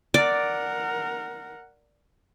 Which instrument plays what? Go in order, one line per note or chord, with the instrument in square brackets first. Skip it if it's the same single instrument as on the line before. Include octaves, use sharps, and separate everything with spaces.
[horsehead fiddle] A#4 F#5 [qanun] D5